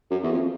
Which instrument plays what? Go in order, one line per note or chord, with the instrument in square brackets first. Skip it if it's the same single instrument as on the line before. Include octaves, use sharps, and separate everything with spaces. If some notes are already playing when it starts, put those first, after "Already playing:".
[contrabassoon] F#2
E2
F2